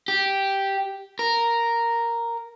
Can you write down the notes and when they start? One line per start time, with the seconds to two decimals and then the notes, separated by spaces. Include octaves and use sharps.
0.08 G4
1.19 A#4